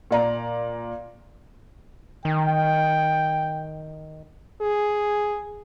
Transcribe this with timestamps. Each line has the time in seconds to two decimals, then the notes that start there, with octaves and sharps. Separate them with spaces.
0.11 A#2 D5 A#5
2.25 D#3 G5
4.61 G#4